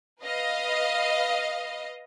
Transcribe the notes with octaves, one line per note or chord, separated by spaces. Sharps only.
B4 D#5 F5